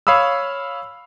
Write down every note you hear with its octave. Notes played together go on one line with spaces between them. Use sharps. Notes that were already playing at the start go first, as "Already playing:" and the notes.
C#5 F5 B5 D#6 E6